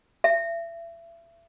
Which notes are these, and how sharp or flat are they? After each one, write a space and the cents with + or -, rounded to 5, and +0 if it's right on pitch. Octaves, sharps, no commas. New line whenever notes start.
E5 +30